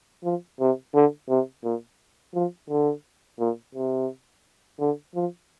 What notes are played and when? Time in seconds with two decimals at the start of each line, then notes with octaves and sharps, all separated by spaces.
0.24 F3
0.60 C3
0.95 D3
1.29 C3
1.64 A#2
2.34 F3
2.69 D3
3.39 A#2
3.75 C3
4.80 D3
5.15 F3